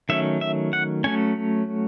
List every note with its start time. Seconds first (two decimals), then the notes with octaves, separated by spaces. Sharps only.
0.09 D#3 F#3 A3 C#4 E5
0.41 E5
0.73 F#5
1.04 F#3 A3 C#4 G#5